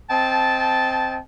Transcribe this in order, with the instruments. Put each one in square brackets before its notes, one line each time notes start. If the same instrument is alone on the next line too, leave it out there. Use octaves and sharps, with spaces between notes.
[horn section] C4 D#5 G5 A5